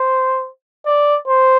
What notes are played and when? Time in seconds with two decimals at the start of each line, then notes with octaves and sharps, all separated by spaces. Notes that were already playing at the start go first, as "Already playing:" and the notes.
Already playing: C5
0.86 D5
1.28 C5